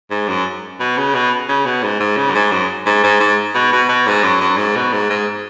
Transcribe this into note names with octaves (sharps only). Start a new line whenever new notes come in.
G#2
F#2
B2
C#3
B2
C#3
B2
G#2
G#2
C#3
F#2
G#2
F#2
G#2
G#2
G#2
B2
B2
B2
G#2
F#2
F#2
G#2
B2
G#2
G#2